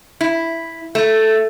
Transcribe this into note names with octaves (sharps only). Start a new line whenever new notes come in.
E4
A3